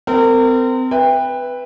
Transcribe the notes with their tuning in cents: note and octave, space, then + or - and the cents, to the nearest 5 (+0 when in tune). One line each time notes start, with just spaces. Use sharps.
C4 -30 A#4 -35
B4 +0 E5 +0 G5 +25